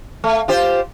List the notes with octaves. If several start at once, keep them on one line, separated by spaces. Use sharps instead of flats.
A3
F4 G4 C5